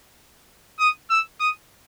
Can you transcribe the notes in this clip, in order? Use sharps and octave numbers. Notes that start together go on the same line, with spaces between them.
D#6
E6
D#6